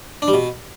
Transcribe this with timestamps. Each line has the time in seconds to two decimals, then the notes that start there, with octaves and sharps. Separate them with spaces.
0.22 D4
0.28 G3
0.33 B2